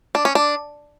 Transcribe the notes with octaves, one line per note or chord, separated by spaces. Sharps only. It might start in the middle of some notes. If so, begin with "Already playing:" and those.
D4
C#4
D4